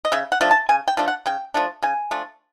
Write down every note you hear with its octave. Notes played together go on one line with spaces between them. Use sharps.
D#5
C#3 E5
F#5
F3 A3 D4
A5
C#3 G#5
G5
F3 A3 D4
F#5
C#3 G5
F3 A3 D4
C#3 G#5
F3 A3 D4